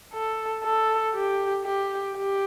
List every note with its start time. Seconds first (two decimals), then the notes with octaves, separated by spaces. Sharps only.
0.13 A4
0.64 A4
1.15 G4
1.65 G4
2.17 G4